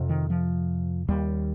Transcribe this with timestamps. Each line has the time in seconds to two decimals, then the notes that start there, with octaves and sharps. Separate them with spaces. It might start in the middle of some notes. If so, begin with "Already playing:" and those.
Already playing: F2 C3
0.09 D#3
0.30 F3
1.08 D#2 G3